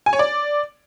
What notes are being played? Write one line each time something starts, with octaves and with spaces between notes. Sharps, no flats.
G#5
C#5
D5